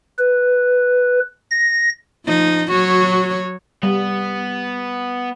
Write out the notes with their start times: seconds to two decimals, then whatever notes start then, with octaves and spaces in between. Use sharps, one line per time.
0.19 B4
1.51 A#6
2.26 F3 D#4
2.71 F#3 F#4 C#5
3.83 G3 B3